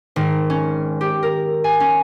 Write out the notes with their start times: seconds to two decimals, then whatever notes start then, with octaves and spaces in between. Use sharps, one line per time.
0.16 G#1
0.50 C#4
1.01 G4
1.23 A#4
1.64 G#5
1.80 C#4